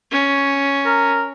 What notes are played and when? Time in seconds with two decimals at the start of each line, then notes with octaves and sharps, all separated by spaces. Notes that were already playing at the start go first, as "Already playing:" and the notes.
0.11 C#4
0.86 A#4